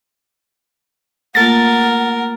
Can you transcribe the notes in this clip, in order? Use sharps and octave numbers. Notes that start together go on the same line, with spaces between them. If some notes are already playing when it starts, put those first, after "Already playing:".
A3 A#3 F4 A#4 F#5 A6